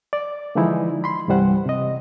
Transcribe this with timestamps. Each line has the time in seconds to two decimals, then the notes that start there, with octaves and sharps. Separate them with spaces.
0.13 D5
0.55 D3 E3 F3 G#3 D#4 E4
1.04 B5 C6
1.28 C2 G2 E3 G3 C5 F#5
1.66 C3 D#5